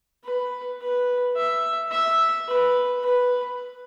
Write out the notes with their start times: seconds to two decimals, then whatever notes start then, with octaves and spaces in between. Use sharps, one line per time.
0.24 B4
0.81 B4
1.36 E5
1.92 E5
2.48 B4
3.04 B4